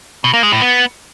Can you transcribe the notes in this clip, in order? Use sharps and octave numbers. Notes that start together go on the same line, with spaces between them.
B2
A#3
G#3
A2
B3